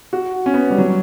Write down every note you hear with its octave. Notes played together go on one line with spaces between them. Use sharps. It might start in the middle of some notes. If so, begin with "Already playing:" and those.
F#4
C#4
B3
G3
F#3